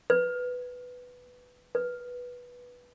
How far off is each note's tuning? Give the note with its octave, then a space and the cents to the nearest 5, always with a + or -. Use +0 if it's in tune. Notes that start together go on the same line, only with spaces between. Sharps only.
B4 +5
B4 -10